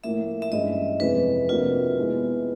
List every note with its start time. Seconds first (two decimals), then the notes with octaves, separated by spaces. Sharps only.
0.04 A2 F3 A#3 E5
0.42 E5
0.52 G2 E3 G#3 C#4 E4 D#5
1.00 F2 C3 E3 G#3 B4
1.49 C3 F3 A#3 D4 F4 F#4
1.97 B2 G#3 B3 E4